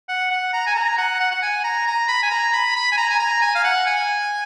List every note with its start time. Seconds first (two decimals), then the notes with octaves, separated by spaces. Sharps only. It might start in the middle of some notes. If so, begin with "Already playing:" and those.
0.09 F#5
0.31 F#5
0.53 A#5
0.67 G#5
0.76 A#5
0.98 F#5
1.20 F#5
1.31 F#5
1.42 G#5
1.64 A#5
1.87 A#5
2.08 B5
2.23 G#5
2.31 A#5
2.53 B5
2.76 B5
2.92 G#5
2.97 A#5
3.09 G#5
3.19 A#5
3.41 G#5
3.55 F5
3.64 F#5
3.86 G#5